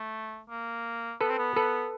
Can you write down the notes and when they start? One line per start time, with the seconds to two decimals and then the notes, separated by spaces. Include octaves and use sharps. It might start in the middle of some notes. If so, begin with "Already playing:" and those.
Already playing: A3
0.49 A#3
1.21 B3 A4 B4
1.30 C4
1.38 B3
1.56 A4 B4